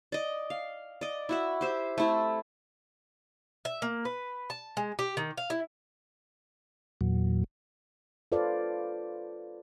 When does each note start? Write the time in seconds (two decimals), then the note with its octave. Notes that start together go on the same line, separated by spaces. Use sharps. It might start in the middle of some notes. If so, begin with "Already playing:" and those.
0.12 D5 D#5
0.50 F5
1.01 D5 D#5
1.29 E4 F#4 E5
1.61 G4 C5 E5
1.98 A3 C4 E4 A4
3.65 E5
3.82 A#3
4.05 B4
4.50 A5
4.77 G#3
4.99 G4
5.17 D#3
5.38 F5
5.50 E4
7.01 E2 A#2 F#3
8.32 F4 A4 B4 C5 D5 F5